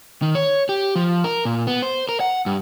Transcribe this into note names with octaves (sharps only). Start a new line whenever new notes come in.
D#3
C#5
G4
F3
A#4
A#2
B3
C5
A#4
F#5
G2